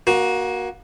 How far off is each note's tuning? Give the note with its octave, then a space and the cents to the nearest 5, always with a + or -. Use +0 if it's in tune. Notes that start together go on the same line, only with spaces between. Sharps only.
A#3 +20 F#4 +0